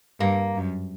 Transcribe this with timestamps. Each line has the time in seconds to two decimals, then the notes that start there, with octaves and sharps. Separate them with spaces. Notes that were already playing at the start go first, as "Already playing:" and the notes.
0.20 G2 A#3
0.56 F#2